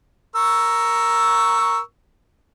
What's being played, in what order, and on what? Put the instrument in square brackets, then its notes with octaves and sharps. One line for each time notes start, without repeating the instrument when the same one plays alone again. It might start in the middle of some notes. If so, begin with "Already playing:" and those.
[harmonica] A#4 C#6 E6